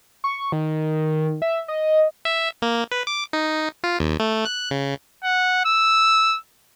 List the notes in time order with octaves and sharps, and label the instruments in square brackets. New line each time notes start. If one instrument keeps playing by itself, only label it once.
[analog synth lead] C#6
D#3
E5
D#5
[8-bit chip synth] E5
A#3
B4
D6
D#4
F4
D#2
A3
F#6
C#3
[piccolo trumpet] F#5
E6